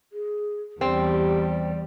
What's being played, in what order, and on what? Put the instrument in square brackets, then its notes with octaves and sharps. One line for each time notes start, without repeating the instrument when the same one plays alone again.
[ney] G#4
[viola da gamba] E2 G3 [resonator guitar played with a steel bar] C4 [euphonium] G4 [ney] D5